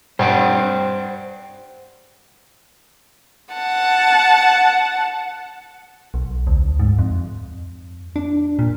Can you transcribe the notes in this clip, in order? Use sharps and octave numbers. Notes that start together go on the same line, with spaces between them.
G2 C5 F#5 G5
F#5 A5
B1
D2
G#2
F2
D4
A#2